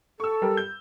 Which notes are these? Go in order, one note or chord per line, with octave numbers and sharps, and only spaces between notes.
A4 C#6 E6
G3 G4 A#4
G6